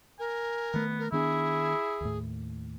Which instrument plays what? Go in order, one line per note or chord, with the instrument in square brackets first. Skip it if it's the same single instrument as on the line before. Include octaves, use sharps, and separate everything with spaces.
[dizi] A#4 [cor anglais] G#5
[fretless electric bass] D#3 A3 [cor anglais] B3
[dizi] A#4
[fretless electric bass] D#3 B3 D4 [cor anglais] E4 [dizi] G#4
[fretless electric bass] D#2 A2